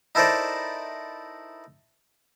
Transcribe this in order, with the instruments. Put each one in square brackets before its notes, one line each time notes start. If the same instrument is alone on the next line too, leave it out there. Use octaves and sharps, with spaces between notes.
[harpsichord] D#4 E4 A4 A#4 C5 D5